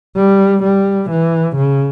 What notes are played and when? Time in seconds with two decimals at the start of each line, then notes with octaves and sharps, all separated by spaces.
0.16 G3
0.63 G3
1.11 E3
1.57 C#3